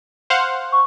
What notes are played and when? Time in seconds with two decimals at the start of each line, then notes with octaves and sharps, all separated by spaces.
0.30 C5 F5 F#5
0.72 C#6